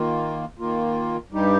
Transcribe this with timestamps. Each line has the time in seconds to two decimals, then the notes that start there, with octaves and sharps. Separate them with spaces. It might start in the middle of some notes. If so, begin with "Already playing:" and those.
Already playing: D#3 A#3 F4
0.59 D#3 A#3 F4
1.32 G2 G3 D#4 G4